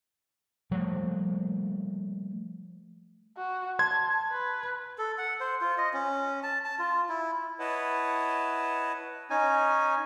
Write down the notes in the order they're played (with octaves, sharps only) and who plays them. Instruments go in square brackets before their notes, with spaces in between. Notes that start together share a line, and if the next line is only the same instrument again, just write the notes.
[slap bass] F3 G3 A3 A#3
[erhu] F#4
[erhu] A5 [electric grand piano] C6 G#6
[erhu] B4
[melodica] A4
F#5
C5
F4
D#5
C#4
A5
A5
F4
E4
[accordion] E4 B4 C#5 D#5 F#5 A5
[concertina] C#4 D#4 G#5